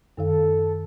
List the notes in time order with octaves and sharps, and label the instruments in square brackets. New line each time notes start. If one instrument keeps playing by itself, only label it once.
[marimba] F#2 D#3 F5 [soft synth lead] A4